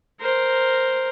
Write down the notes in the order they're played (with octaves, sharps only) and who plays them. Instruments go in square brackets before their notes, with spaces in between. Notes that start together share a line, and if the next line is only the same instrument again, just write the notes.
[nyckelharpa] A#4 C5